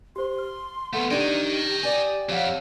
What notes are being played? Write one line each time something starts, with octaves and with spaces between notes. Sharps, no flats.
G4 C5 C6
F6
A3 B3 A4 F#5
D4 D#4 G4 D#5 G5 G#6
G4 D5 G#5
F2 C#5 F5 F#5